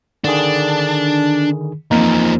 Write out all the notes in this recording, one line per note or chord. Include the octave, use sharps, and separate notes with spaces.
D3 D#3 D4 G#4
E2 F3 A#3 C4 D#4